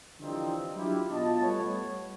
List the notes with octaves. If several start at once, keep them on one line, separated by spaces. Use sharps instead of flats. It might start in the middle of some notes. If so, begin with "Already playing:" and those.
D3 E3 F3 G3 C4 D#4
F#3 D4 E4 F4 G4
B2 F4 D#5 A5
G3 A3 B3 C#5